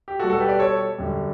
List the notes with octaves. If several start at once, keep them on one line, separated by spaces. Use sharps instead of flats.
G4
B2 G3 F#4 A4
A4
G4 B4
D5
A4 C#5
F#2 D3 G3